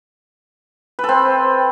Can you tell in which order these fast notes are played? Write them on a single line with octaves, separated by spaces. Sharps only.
B4 A4 C4